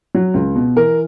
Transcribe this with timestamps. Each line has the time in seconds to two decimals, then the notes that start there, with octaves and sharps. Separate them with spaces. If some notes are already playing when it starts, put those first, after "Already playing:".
0.15 F#3
0.34 C#2
0.55 B2
0.76 E3 A#4